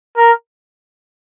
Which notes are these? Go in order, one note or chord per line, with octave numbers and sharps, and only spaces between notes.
A#4